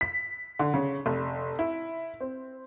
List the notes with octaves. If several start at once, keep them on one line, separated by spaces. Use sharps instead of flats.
B6
D3
C#3
F1
E4
C4